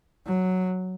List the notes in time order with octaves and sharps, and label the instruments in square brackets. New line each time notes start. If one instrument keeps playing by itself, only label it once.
[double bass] F#3